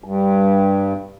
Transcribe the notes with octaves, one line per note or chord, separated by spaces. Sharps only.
G2